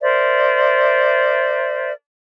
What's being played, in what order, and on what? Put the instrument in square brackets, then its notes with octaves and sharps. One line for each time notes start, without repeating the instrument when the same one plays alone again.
[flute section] A#4 C5 D5 E5